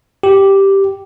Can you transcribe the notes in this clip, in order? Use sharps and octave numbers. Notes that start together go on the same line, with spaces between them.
G4